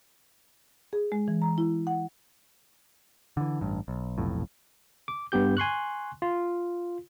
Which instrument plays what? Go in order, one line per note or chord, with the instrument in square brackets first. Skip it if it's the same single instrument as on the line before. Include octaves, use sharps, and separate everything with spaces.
[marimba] G#4
G#3
E3
A#5
E4
F#5
[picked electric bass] D3 E3
A1 G2
B1
F1 B1 F2 A2
[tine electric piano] D6
G2 B3 G4 G6
G#5 C6 C#6 F#6
F4